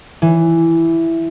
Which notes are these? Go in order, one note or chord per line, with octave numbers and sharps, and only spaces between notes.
E3